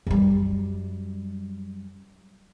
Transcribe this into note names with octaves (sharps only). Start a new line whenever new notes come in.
F#2 G3